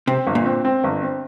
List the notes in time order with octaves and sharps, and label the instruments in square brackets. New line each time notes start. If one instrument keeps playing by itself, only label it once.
[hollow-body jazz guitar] C3 [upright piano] C4
[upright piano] G1
[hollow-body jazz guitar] A#2
[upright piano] C4
C4
G1
C4